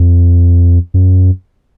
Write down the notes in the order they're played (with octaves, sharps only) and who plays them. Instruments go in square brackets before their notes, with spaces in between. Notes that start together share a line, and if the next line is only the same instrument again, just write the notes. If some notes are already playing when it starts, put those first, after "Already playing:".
Already playing: [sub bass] F2
F#2